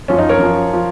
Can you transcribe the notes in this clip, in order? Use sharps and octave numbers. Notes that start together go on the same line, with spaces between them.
F#2 F3 C#4
D#4
A#4 C#5
F#2 F3
F3